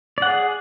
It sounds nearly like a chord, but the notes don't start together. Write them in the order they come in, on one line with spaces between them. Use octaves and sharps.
D5 F#5 G#4